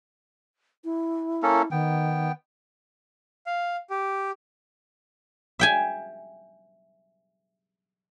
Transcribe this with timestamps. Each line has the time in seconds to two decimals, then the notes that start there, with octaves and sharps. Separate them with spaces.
0.84 E4
1.43 A#3 C#4 A4
1.71 D#3 B3 G5
3.47 F5
3.90 G4
5.59 E5 G5 G#5